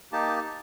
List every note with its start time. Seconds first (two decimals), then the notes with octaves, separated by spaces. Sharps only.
0.12 A#3 D#4 G4 A5